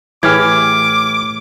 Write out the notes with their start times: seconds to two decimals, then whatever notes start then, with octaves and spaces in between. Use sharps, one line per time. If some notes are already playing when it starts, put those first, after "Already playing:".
0.23 A2 E3 G4 G#4 D6 F6 G#6